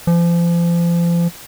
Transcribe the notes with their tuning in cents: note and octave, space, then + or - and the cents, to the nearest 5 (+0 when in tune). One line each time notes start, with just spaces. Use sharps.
F3 -35